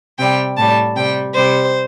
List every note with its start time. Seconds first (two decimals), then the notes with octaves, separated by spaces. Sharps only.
0.18 C3 G3 G5
0.57 A2 G3 A5
0.95 C3 G3 G5
1.34 C3 G3 C5